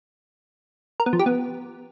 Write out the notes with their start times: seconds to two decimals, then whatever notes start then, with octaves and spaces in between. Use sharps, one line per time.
1.00 A#4
1.06 B3
1.13 F3
1.19 G4
1.26 B3